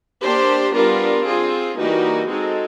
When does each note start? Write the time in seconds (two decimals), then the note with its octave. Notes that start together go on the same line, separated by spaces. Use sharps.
0.21 A#3 D4 G4 C5
0.73 G3 B3 D4 F4 A#4
1.25 C4 F4 G#4
1.77 E3 G3 A#3 D#4 F#4
2.28 G#3 C4 D#4 F#4 A4